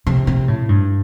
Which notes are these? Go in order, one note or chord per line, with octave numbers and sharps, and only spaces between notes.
C3
C3
A2
G2